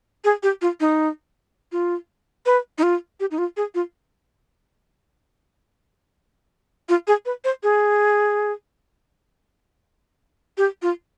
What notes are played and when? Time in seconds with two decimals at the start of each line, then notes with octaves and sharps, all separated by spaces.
0.25 G#4
0.43 G4
0.62 F4
0.80 D#4
1.72 F4
2.46 B4
2.78 D#4
2.83 F4
3.20 G4
3.31 D#4
3.38 F4
3.57 G#4
3.75 F4
6.89 F4
7.07 G#4
7.26 B4
7.44 C5
7.63 G#4
10.58 G4
10.82 F4